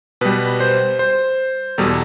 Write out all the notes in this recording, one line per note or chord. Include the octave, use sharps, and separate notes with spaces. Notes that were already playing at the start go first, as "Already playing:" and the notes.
B2 G3 B4
C5
C5
E2 B2 G3 A4